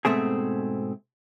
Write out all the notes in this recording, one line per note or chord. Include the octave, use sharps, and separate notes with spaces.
G#2 B2 A3 C4 G#4